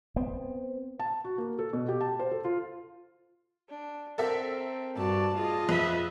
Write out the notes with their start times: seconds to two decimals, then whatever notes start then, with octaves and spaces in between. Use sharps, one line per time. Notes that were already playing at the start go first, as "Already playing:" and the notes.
0.16 B3 C4
0.99 A5
1.24 F#4
1.38 A#3
1.59 A4
1.73 B2
1.88 G4
2.01 A5
2.19 C5
2.31 A4
2.44 F4
3.69 D4
4.18 C4 A4 A#4 E5
4.97 G2 F#4 D5 A5
5.37 F4 G#4 D#5
5.69 F2 B4 E5 B6